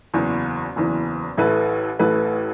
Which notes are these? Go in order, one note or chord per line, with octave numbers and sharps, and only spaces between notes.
F#1 E2 E3
F#1 E2 E3
A1 A2 A3 E4 B4
A1 A2 A3 E4 B4